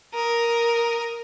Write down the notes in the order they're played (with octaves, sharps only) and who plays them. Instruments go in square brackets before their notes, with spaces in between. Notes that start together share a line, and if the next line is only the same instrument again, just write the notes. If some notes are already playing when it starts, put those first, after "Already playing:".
[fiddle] A#4 D#6